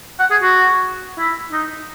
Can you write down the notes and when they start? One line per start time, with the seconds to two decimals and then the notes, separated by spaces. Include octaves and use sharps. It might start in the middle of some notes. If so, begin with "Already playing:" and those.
0.20 F#5
0.31 G#4
0.42 F#4
1.18 E4
1.52 D#4